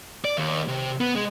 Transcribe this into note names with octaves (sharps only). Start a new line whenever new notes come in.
D5
D#2
C3
B3
G#3